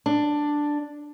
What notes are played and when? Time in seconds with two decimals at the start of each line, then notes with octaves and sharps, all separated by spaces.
0.06 D4